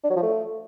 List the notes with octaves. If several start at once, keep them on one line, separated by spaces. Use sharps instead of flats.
D4
F#3
F3
A3